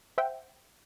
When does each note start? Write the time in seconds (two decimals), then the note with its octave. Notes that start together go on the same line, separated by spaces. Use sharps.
0.18 C5 E5 F#5 G5